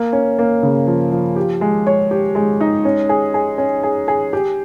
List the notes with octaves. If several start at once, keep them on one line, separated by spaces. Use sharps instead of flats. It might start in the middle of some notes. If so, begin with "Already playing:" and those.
Already playing: A#3
C#4
A#3
C#3
F3
F3
G4
G#3
C#5
G4
G#3
D#4
C#4
G#4
G#4
C#4
G#4
G#4
G4